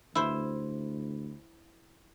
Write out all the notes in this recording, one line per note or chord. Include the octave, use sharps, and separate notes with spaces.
D2 E4 C5